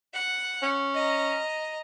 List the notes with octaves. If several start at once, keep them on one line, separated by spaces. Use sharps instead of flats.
F#5
C#4
D#5 A#5